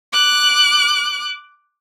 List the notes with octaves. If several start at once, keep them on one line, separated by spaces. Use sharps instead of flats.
D6 F#6